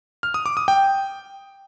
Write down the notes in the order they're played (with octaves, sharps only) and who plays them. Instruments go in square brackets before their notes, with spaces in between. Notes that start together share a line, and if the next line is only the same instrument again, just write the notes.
[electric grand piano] F6
D#6
D6
D#6
G5